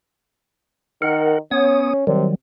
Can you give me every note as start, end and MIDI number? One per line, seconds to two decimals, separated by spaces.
1.02 1.38 51
1.02 1.38 70
1.02 1.38 78
1.51 1.93 59
1.51 2.06 61
1.51 1.93 73
1.51 1.93 87
2.07 2.27 48
2.07 2.35 51
2.07 2.35 54
2.07 2.35 55